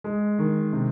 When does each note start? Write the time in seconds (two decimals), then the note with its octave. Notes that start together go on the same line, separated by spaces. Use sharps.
0.04 G#3
0.39 D#3
0.73 C3